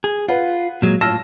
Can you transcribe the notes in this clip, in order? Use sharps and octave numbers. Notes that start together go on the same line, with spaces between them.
G#4
F4 B4 F#5
A#2 F#3 G#3
A2 F4 A5 E6 F6 A#6